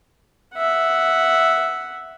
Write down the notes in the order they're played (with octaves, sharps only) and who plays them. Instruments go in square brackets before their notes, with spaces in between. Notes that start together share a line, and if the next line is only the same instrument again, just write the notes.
[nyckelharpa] E5 F#5